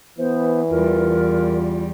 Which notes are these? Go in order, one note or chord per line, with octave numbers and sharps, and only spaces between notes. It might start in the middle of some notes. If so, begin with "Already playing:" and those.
E3 B3 C5
E2 G3 F4 A#4